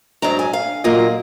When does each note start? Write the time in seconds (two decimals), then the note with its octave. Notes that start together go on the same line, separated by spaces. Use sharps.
0.22 G#2 F#3 D4 A#5
0.39 G#5
0.53 F5
0.84 A#2 F#3 A#3 F4 D#5